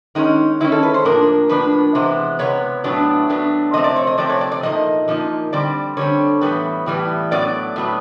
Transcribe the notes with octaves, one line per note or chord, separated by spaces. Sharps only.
D#3 G#3 C#4 D#4
D#3 G#3 C#4 E4
A4
B4
C5
A2 F3 A#3 D4 A#4
A2 F3 A#3 D4 B4
C3 E3 G#3 B3 C5
C3 E3 G#3 B3 C#5
A2 F#3 B3 D4
A2 F#3 B3 D4
C3 F3 A3 C4 D#5
D5
C#5
D#5
C3 F3 A3 C4 D5
C#5
D5
D5
A#2 F3 A#3 D#4 D#5
A#2 F3 A#3 D#4
D3 G3 C4 D5
D3 G3 C4 C#5
A2 E3 G3 B3
A2 E3 G3 B3
A2 F#3 B3 D5
A2 F#3 B3